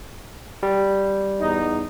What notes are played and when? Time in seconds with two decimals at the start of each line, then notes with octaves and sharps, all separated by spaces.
0.63 G3
1.40 E2 D#4